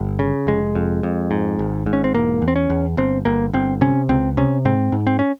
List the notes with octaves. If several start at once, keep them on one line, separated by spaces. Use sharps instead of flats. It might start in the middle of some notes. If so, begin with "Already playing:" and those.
Already playing: G1
C#3
F1 G#3
F2
F2
G#2
G#1
G#2
C#4
C4
E1 A#3
E2
C4
C#4
E2
G1 C4
G1 A#3
G1 C4
C3 C#4
C#2 C4
C3 C#4
G#2 C4
G#2
C4
C#4